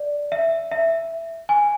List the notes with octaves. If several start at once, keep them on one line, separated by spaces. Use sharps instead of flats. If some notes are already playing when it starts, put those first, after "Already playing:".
Already playing: D5
E5
E5
G#5